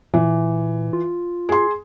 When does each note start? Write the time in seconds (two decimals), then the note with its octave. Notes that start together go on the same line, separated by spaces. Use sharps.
0.14 A#2 E3
0.93 F4
1.49 G#4 C6